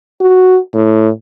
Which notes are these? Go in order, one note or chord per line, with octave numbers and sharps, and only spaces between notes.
F#4
A2